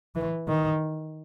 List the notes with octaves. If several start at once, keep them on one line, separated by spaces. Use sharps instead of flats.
E3
D#3